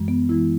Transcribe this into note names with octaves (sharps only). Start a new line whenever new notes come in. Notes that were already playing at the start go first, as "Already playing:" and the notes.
Already playing: F#2 E3 G#3
B3
F#2 E3 G#3 E4